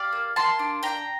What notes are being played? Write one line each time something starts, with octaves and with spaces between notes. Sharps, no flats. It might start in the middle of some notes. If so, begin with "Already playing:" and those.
Already playing: G4 D5 F5
A#3
A#3 A5 C6
D4
D4 G5 A#5